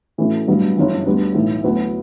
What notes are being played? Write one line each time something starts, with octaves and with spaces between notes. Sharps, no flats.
A2 E3 A3 C#4 F#4
A1 G2 F#3 B3
G1 F#2 E3
D2 D3 G3 B3
B1 A2 E3
D2 D3 F#3 B3 E4